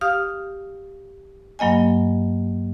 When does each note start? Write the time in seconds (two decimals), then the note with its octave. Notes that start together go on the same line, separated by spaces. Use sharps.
0.01 G4 F5 D#6 F6
1.59 G2 F#3 A#3 D#5 G#5